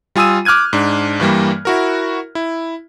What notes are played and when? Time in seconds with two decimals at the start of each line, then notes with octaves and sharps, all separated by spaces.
0.16 G3 F4 G#5 D#6 E6 D#7
0.45 D6 F6 F#6 G#6 D#7
0.73 G#2 D4
1.20 G2 E3 G3 A#3
1.65 E4 F#4 A#4
2.35 E4